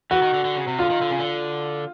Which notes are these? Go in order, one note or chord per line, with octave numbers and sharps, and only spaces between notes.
E3 F#4
D#3
D3
D3
C#3
C3
D3 F4
D#3
D3
C#3
D3